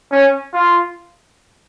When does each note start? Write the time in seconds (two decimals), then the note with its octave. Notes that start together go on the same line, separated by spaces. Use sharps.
0.12 C#4
0.53 F4